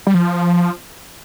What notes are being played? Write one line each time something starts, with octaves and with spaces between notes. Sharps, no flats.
G3
F3